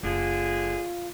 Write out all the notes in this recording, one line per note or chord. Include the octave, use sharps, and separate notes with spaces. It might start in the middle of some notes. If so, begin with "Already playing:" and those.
F#1 D3 F4 G#4